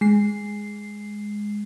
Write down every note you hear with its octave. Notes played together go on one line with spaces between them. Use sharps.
G#3 C7